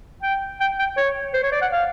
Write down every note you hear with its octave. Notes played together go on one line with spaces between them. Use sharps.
G5
G5
G5
C#5
C5
C#5
D5
F#5
F5